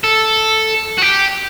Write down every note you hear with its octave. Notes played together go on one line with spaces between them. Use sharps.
A4
F#4
G4